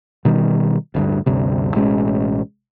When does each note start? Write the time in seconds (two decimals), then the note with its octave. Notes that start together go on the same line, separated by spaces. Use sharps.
0.25 B2 D#3 G3
0.94 D1 D2 G2
1.26 D2 G2 C3
1.74 A1 B2 G#3 C#4